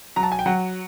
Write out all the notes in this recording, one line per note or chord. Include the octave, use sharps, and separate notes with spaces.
F#3 A#5
A5
G#5
G5
F#3 F#5